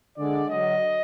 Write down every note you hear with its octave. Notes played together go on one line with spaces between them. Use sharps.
D3 G#3 D5
D3 F#3 D#5